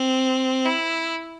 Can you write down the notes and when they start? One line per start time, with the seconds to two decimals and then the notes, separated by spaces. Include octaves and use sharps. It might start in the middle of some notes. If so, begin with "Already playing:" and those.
Already playing: C4
0.65 E4